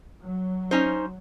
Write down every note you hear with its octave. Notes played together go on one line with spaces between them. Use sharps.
F#3
C#4 D#4 C5